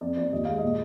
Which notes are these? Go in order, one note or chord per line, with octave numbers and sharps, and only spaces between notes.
F2 D5
F3 D5
D#2 D#5
G#3 F5
A#2 D#5